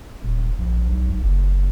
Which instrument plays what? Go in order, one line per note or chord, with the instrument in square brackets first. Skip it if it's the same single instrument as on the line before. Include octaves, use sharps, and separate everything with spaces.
[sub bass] D#1
A#1
B1
B1
F#1